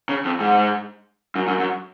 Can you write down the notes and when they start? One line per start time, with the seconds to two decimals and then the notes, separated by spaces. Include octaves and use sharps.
0.09 C#3
0.25 F2
0.40 G#2
1.36 F#2
1.48 F#2
1.60 F#2